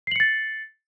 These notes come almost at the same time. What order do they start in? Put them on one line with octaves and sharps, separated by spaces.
C7 F#7 C#7 A6